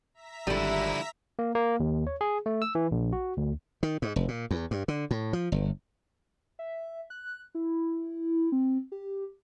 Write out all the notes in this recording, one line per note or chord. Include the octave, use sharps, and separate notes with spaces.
E5 A#5 B6
G#1 D3 F3 G3 E4
A#3
A#3
D#2
C#5
G#4
A3
E6
E3
A#1
F#4
D2
D#3
G#2
F1
A#2
E2
G2
D3
A2
F3
G1
E5
F#6
E4
C4
G4